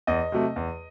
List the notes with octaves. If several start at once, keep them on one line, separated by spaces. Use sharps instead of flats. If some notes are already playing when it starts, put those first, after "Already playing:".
E2 D#5
C3 F#3 A3
E2